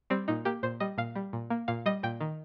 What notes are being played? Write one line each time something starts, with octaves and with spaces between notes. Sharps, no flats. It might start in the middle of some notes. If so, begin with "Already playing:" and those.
G3 C4
A#2 D#4
A#3 G4
A#2 C5
G3 D#5
A#2 F5
G3
A#2
A#3
A#2 F5
G3 D#5
A#2 G5
D#3